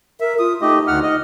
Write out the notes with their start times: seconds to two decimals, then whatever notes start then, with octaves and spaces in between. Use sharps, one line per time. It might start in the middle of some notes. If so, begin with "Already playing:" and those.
0.20 A#4 E5
0.39 F4 D#6
0.61 A3 D#4 G4 D#5
0.87 D2 F#5 F6
1.03 D#5